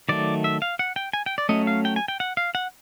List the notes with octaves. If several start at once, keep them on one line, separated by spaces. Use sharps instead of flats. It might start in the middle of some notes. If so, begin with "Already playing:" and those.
D#3 F#3 A3 D5
E5
F5
F#5
G5
G#5
G5
D5
F#3 A3 C#4 D#5
F5
G5
G#5
G5
F#5
F5
F#5